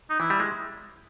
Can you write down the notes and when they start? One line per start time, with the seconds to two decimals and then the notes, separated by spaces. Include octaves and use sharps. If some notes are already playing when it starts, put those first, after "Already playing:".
0.10 D#4
0.20 E3 E4
0.30 G3
0.40 G#3